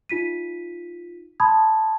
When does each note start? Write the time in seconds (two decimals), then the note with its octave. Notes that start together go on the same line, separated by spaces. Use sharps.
0.09 D#4 F4 B6 D#7
1.40 A5 B5 C6 D#6 G#6